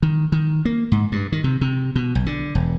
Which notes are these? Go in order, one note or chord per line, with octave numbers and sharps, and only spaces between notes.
D#3
D#3
A#3
G#2
G2
D#3
C3
C3
B2
B1
D3
E1